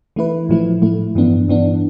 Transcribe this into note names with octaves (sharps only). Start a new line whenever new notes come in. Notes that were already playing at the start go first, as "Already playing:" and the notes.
E3 A3 E4 B4
A2 F3 A3 E4
A2 F3 A3 E4
G2 E3 B3 D4
G2 E3 B3 D4